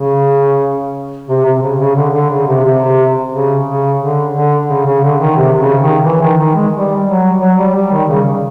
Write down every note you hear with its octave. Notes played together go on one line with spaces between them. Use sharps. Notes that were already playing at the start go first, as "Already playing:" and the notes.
Already playing: C#3
C3
C3
C#3
C#3
D3
D3
C#3
C3
C3
C#3
C#3
D3
D3
C#3
C#3
D3
D#3
C3
C#3
D#3
E3
D#3
D#3
G#3
G3
F#3
F#3
G3
G3
D#3
C#3